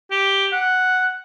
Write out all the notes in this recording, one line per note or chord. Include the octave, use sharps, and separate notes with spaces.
G4
F#5